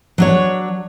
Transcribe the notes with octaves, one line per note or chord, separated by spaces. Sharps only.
F#3 D4 C#5